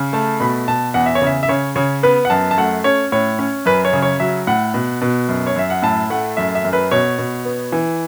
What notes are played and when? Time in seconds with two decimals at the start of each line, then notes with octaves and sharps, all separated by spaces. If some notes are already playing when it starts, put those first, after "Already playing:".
Already playing: C#3
0.13 A3 A5
0.40 B2 B5
0.68 B2 A5
0.94 E2 F#5
1.06 E5
1.15 C#5
1.22 C#3 E5
1.43 E5
1.49 C#3 C#5
1.76 C#3 C#5
2.03 B3 B4
2.25 F#5
2.30 F#2 A5
2.51 A5
2.58 A3 F#5
2.84 C#4 C#5
3.12 A2 C#5
3.39 C#4
3.66 F#2 B4
3.85 C#5
3.93 C#3
4.02 C#5
4.20 F#3 E5
4.47 A2 F#5
4.74 B2
5.01 B2
5.28 F#2
5.47 C#5
5.56 F#2 E5
5.70 F#5
5.82 A2 A5
6.10 A3 F#5
6.37 F#2 E5
6.55 E5
6.65 F#2
6.73 B4
6.91 B2 C#5
7.18 B2
7.45 B3
7.72 E3